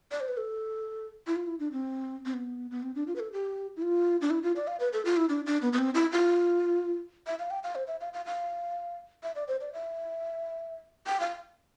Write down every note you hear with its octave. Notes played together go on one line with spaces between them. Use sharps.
D5
C5
B4
A4
E4
F4
E4
D4
C4
C4
B3
B3
C4
D4
F4
B4
A4
G4
E4
F4
D4
E4
F4
D5
F5
B4
A4
F4
E4
D4
D4
B3
B3
C4
E4
F4
E5
F5
G5
F5
C5
E5
F5
F5
F5
E5
D5
C5
D5
E5
G5
F5